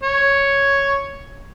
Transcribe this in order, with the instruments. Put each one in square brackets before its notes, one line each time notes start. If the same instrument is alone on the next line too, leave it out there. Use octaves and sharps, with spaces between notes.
[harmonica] C#5